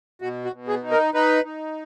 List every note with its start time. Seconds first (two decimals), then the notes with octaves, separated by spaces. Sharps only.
0.22 B2 F#4
0.45 F#4
0.53 B2
0.68 G#4
0.83 D#4
0.91 A#4
1.14 D#4 B4
1.45 D#4